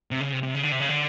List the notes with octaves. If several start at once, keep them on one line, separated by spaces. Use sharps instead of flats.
C3
C#3
C3
C3
C#3
D3
C3
C#3
D3